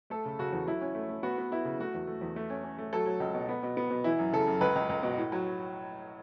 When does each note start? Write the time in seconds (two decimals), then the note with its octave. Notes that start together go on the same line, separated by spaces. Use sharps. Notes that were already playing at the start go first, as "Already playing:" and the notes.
0.10 A3 A4
0.25 C#3
0.39 C#3 F#4
0.53 E2
0.67 F#3 E4
0.81 C#4
0.95 A3
1.09 A3
1.23 B3 F#4
1.38 B3
1.51 B3 E4
1.65 C#3
1.80 A3 F#4
1.94 E2
2.07 A3
2.21 E2
2.36 A3
2.50 C#4
2.64 C#4
2.78 A3
2.93 F#3 A4
3.06 F#3
3.20 C#2
3.35 B2
3.49 B3
3.63 B2
3.77 B3
3.91 B2
4.04 E3 E4
4.19 F#2
4.33 C#3 A4
4.47 F#2
4.61 C#2 B4
4.76 C#2
4.89 C#2
5.03 B2
5.18 A2
5.32 F#3